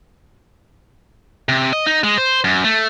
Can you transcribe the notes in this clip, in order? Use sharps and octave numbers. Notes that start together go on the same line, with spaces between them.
C3
D#5
D#4
G#3
C5
F#2
A3